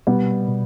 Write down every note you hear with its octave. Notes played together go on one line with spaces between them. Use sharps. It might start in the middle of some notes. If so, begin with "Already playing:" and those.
B2 G3 B3
B2